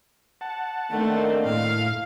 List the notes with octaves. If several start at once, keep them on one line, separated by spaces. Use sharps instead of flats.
F#5 A5
D#3 A3 A#3 C4 D4
A2 F5